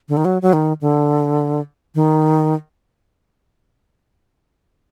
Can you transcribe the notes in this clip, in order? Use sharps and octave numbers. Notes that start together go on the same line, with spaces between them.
D3
D#3
F#3
F#3
D#3
D3
D#3